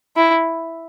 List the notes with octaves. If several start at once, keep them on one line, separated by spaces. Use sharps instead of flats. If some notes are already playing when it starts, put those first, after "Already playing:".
E4